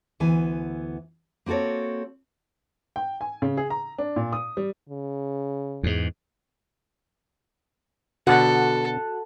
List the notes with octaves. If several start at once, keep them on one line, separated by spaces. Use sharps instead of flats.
D2 E3 B3 G#5
A#3 C4 F#4 A4 C#5
G5
G#5
C#3
G#4
A#5
D4
A#2
D#6
G3
C#3
E2 G#2
B2 D3 F#4 A4 F#5 F#6